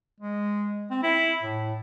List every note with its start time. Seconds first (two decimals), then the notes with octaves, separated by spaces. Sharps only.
0.20 G#3
0.90 C4
1.03 E4
1.43 A2